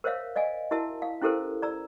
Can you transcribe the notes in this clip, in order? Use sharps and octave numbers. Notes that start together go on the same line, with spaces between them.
A#4 C5 C#5 E5 F5
D5 D#5 F5 G#5
E4 F#4 A#4 E5 A5
F5
C#4 E4 G4 A4 A#4 C5
D5 A#5 E6